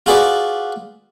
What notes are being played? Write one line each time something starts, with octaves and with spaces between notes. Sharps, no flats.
F4 F#4 G#4 B4 D5